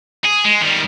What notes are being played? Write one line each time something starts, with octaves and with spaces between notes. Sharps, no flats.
G#4
G#3
D#3 G3